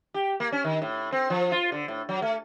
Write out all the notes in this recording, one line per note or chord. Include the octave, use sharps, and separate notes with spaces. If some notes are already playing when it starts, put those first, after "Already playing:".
G4
A#3
C#4
D#3
A2
C4
F3
F4
D3
A2
F#3
A3